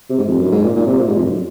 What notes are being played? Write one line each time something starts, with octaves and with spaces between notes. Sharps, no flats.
C3
G#2
F2
F#2
G#2
A#2
A#2
C3
A#2
G#2
F2
F#2